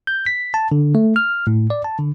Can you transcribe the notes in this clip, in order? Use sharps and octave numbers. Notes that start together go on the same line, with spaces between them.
G6
B6
A5
D3
A3
F6
A2
D5
A5
D3